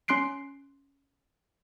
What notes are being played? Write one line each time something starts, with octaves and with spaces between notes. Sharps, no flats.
C#4 C6 F#6 C7 D7